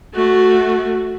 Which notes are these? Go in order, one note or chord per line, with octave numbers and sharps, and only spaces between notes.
A3 F#4